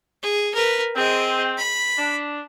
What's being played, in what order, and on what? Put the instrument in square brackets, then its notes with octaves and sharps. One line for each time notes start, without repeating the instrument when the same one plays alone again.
[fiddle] G#4
A#4 B4
[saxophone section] C4 [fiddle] G#4 D#5
[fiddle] B5
[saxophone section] D4